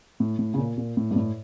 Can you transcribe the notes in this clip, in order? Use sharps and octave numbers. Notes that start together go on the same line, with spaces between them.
A2
A2
C#3
A#2
A#2
A2
G2
A2